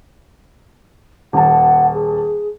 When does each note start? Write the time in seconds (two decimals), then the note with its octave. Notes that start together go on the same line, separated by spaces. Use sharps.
1.33 D#1 F#5 A5
1.92 G#4